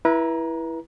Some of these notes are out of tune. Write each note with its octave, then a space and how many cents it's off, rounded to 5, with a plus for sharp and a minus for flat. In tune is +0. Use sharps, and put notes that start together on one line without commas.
E4 +0 B4 -30 A#5 +15